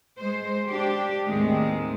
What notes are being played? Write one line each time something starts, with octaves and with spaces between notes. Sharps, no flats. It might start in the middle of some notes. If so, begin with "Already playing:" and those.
G#3 C5
D4 G4
D#2 A2 D#3 G#3 C4